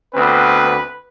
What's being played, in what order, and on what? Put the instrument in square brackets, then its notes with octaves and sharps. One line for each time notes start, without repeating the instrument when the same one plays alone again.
[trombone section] D2 B3 C4 [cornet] B4